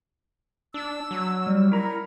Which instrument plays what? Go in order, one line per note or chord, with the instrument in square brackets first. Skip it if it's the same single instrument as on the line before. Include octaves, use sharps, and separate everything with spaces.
[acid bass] D4 [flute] E6
[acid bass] F#3
[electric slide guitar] G3
[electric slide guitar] E4 A#5 [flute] A#4